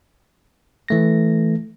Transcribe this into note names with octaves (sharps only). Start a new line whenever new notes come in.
E3 A3 A#6